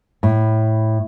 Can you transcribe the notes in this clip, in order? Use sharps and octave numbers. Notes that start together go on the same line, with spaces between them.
A2